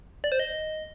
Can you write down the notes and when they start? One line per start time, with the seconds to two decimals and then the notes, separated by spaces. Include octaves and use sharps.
0.24 D5
0.32 C5
0.40 D#5